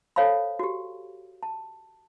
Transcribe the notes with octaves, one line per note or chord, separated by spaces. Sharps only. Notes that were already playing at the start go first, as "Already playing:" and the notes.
A4 C5 C#5 F5 A5 B5
F#4 G4
A5